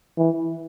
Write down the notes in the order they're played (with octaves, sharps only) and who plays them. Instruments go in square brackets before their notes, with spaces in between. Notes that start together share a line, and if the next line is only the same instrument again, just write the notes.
[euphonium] E3